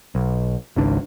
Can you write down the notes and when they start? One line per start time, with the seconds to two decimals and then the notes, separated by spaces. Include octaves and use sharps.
0.15 B1
0.76 G#1 C#2 D4